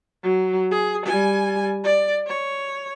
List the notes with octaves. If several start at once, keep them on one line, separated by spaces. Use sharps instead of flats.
F#3
G#4
G3 G#5
D5
C#5